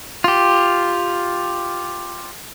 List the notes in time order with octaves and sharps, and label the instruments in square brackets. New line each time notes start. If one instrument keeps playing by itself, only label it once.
[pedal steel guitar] F4 G4